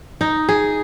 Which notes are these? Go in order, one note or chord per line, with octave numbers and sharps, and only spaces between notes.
D#4
G#4